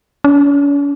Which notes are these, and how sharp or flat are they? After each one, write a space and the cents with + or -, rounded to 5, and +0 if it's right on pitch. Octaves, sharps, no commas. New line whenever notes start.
C#4 +45